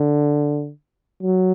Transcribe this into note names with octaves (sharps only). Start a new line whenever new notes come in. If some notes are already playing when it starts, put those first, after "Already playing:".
Already playing: D3
F#3